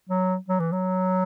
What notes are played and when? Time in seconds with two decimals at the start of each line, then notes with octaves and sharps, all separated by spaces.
0.10 F#3
0.49 F#3
0.60 E3
0.72 F#3